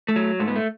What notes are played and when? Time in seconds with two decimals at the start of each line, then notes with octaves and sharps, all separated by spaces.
0.08 A3
0.16 F#3
0.40 G#2 A3
0.48 B3
0.56 A3